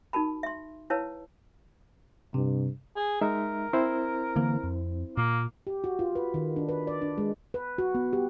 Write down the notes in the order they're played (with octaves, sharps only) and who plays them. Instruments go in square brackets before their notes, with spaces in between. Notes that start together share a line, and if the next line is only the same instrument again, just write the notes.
[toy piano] D#4 F#4 A#4 A5 B5
E5 C6
E4 B4 C#5 F5 A5 E6
[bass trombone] G2 [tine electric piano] C3
[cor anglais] G#4
[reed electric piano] G#3 D#4 E5 [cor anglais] A#4
[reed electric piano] C4 E4 C5
[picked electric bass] D3 E3 A#3
F2
[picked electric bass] A#2 [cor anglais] A#3
[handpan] G4
F#4
F4
B4
D#3
D4
B4
D5
D4
G#3
B4
F#4
B3
G4